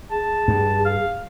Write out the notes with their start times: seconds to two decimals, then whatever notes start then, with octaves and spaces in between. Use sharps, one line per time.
0.11 G#4 A5
0.48 G2
0.85 F5